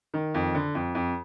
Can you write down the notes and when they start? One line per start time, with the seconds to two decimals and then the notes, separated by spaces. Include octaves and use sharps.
0.14 D#3
0.34 F2
0.55 D3
0.75 F2
0.95 F2